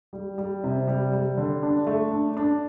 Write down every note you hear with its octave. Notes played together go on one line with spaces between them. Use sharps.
G3
G3
C3
G3
G3
D3
D4
A3
D4
D4